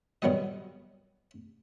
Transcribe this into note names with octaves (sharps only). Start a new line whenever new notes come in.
G2 D#3 F#3 G3 D#5